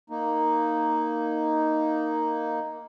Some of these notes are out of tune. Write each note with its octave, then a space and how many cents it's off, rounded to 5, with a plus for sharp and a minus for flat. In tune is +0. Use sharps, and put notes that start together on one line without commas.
A#3 +0 D#4 +0